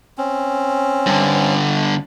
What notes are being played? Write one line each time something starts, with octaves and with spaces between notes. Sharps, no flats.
C4 C#4
G2 D3